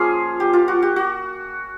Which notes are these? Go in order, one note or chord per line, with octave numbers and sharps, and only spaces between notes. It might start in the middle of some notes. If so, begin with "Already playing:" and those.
Already playing: F3 A#3 C#4 F4 G#4
G4
F4
F#4
G4
F#4